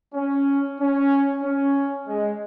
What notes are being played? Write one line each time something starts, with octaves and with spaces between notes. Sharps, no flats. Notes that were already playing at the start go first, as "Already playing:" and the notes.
C#4
C#4
C#4
G#3